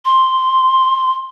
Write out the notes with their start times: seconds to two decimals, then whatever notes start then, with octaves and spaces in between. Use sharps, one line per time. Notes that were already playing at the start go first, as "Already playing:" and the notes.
0.05 C6